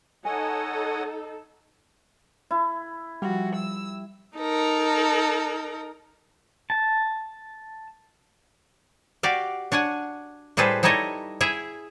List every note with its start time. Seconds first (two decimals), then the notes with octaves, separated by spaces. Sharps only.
0.25 D#4 A4 C#5 D#5 F#5 G#5
2.51 E4
3.22 F3 G3 F#4
3.55 E6
4.36 D#4 A4 A#4
6.70 A5
9.23 F#4 G4 D5 F5
9.72 D4 C#5 F#5 G#5
10.57 A2 G3 G#4 A4 B4 C5
10.83 G3 D#4 E4 A4 C#5 D#5
11.41 E4 G#4 E5